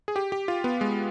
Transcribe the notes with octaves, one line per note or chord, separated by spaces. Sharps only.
G#4
G4
G4
F4
B3
G#3